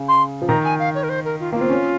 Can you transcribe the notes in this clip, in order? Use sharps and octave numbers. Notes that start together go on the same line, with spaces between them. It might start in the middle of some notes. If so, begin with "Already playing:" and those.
Already playing: C#3
C6
F3
D#3 A#5
G#5
F5
C#5
A#4
C5
A#4
F4
A#3 F4
C4
C#4